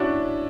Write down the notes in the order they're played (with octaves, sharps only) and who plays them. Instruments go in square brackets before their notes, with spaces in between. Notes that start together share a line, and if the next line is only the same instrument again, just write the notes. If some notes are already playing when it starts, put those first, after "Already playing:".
Already playing: [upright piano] C#4 D4 E4 F#4